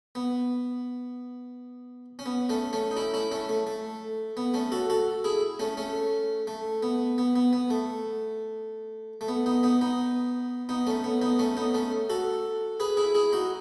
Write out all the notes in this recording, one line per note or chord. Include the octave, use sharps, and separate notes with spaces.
B3
C#4
B3
A3 C#4
A3 C#4
D#4
C#4 E4
C#4 E4
A3 C#4
A3
A3
B3
A3 C#4
F#4 A4
F#4 A4
E4 G#4
A3 C#4
A3 C#4
A3
B3
B3
B3
B3
A3
A3
B3
B3 D#4
B3 D#4
B3 D#4
B3 D#4
A3 C#4
B3
B3 D#4
A3 C#4
B3 D#4
A3 C#4
F#4 A4
G#4 B4
E4 G#4
E4 G#4
D#4 F#4